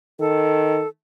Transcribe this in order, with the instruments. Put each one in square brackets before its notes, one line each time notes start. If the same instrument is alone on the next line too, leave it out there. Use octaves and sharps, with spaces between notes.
[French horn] D#3 [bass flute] A4